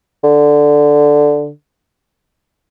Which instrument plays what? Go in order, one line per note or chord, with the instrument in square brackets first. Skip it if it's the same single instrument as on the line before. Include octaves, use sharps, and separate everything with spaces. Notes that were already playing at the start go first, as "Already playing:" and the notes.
[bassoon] D3